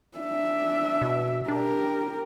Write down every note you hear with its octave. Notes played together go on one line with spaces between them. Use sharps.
D4 E5
B2
D4 G4 A#4